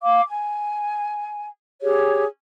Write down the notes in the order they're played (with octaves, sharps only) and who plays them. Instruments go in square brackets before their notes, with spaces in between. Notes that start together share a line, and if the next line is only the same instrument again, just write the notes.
[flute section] F5 D6
G#5
G4 G#4 C#5